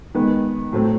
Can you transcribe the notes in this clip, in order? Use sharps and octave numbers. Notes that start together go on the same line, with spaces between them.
D#3 G#3 B3
A2 F#3 A3 C4